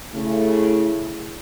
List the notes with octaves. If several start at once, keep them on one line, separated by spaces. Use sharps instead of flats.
C#3 A3 E4